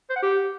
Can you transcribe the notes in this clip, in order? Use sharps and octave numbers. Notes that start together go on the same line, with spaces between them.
C5
F#5
G4